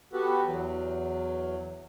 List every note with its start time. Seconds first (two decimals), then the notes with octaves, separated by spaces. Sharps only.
0.13 B3 F#4 G4 A4 B4
0.43 E2 F#3